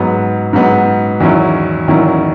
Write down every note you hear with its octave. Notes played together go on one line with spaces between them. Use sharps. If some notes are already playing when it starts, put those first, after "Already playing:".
Already playing: G#2 F#3 B3
G#2 F#3 B3
E2 D#3 F#3 C#4 E4
E2 D#3 F#3 C#4 E4